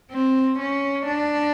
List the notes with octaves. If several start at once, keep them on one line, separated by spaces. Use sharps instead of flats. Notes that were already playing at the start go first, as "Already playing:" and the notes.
C4
C#4
D4